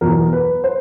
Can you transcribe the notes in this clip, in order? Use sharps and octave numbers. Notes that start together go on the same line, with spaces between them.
E2 B2 F#3 A#4
B4
C5